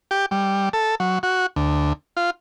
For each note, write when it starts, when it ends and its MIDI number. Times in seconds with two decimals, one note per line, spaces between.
0.11 0.26 67
0.31 0.69 55
0.73 0.95 69
1.00 1.19 54
1.23 1.46 66
1.56 1.93 38
2.17 2.30 65